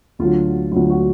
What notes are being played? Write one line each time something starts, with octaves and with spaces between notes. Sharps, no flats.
D2 D3 F#3 F4
D2 D3 F#3 F4
F#4